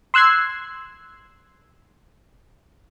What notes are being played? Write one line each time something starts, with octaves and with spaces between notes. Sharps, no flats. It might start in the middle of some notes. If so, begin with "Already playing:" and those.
C6 E6 F#6 G#6 C7